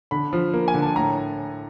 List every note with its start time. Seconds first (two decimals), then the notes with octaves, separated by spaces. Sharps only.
0.11 D3 B5
0.33 F3
0.54 A#3
0.68 G#5
0.74 D3
0.82 A5
0.96 A2 A#5